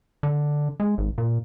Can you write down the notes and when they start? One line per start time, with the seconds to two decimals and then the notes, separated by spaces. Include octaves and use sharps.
0.23 D3
0.80 G#3
0.98 G#1
1.18 A#2